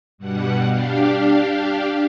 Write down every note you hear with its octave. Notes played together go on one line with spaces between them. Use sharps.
G2 B2 G3 F#5
D4 G4 F5